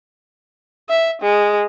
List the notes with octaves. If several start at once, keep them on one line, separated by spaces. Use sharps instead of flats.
E5
G#3